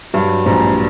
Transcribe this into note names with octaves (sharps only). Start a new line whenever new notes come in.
G2 F#3
A#1 G#2